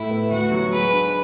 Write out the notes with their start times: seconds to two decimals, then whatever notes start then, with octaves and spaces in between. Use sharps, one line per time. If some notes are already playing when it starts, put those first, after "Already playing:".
Already playing: A2 A3 E4
0.10 B3
0.30 D2 F#4
0.51 F#3
0.72 G#3 B4
0.93 D4